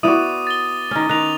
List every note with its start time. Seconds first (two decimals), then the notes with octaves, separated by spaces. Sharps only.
0.03 B3 E4 F#4 D5 D6 D#6 D#7
0.47 A6 G7
0.91 D#3 C#4
1.09 D#3 F#6 F7